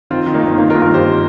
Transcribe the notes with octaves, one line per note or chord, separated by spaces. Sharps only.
D#3 C4 F4
D#3
A#3 D#4
G1
D#3 A#3 D#4
F4 A#4
G1
F4 A#4
G1 G4 C5